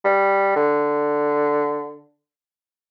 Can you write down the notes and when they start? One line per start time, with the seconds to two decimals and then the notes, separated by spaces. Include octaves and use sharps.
0.05 G3
0.56 D3